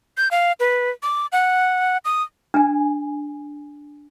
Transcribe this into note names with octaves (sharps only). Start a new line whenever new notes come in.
G6
F5
B4
D6
F#5
D#6
D4 G#5